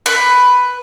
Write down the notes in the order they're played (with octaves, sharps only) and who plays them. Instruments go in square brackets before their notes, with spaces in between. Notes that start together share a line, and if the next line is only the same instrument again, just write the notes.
[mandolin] B4